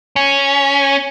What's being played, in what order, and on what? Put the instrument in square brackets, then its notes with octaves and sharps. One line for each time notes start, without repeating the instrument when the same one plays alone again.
[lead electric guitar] C#4